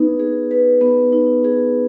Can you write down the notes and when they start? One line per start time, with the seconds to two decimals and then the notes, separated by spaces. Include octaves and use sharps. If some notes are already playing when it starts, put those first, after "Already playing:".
Already playing: B3 D#4 B4
0.20 G#4
0.51 B4
0.81 B3
1.12 D#4
1.44 G#4